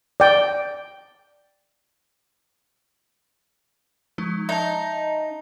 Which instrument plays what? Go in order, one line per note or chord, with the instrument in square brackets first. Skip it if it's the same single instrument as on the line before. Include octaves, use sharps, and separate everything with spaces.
[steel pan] D5 G5
[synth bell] F3 G#3 D#4
[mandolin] D#4 [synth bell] E5 A5